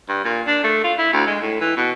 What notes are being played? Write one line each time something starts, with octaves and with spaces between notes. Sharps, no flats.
G2
A#2
D4
A3
F4
E4
D2
G#3
A2
E3
B2